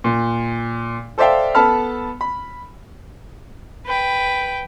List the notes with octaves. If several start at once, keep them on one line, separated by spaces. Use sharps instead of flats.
A#2
A4 C5 D5 E5 F5 G5
B3 A4 A5 B5 F6
B5
B4 G5